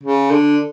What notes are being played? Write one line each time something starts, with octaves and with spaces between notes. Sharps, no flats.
C#3
D3